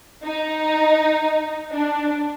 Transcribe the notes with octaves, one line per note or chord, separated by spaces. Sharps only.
D#4
D4